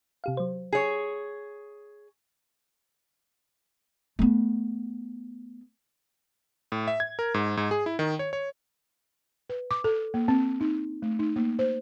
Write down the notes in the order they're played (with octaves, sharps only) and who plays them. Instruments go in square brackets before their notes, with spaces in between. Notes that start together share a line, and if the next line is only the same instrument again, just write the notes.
[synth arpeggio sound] C3 G4 F5
F#3 C5
[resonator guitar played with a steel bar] G#4 C#5
[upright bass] A3 B3
[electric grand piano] A2
E5
G#6
A#4
G#2
G#2
G#4
E4
D#3
C#5
C#5
[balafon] B4
D6
A4
A#3
C4
D#4
A3
D#4
A#3
C5